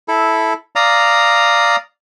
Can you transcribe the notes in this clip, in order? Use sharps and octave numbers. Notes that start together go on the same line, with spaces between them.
E4 A4
D5 F5 A#5 D#6